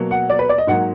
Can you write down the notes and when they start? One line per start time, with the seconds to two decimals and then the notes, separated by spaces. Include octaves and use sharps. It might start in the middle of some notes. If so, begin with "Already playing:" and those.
Already playing: B2 F#3 A#3
0.11 F#5
0.30 D5
0.39 B4
0.49 D5
0.58 D#5
0.67 G#2 F#3 A#3 F#5